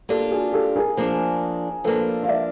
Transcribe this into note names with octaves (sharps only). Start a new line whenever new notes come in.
A#3 D4 F4 G4 A4
F#4 G#4
G4 A4
G#4 A#4
F3 A#3 D4
F3 A#3 D4 A4 B4
F5
D5 E5